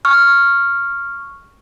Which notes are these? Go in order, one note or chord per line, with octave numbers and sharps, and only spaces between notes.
C#6 F6